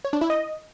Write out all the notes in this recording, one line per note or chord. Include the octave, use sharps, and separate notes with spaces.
C#5
D4
E4
D#5